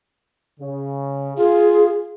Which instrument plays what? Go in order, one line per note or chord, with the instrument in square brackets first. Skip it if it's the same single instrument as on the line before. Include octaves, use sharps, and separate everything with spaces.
[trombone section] C#3
[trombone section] F4 [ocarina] G#4